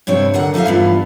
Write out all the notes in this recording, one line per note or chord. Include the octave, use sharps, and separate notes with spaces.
G2 C3 C4 C#5
D2 D3 A#4 F#5
D#4 A4 B4 E5 F5
G2 E3 B3 F4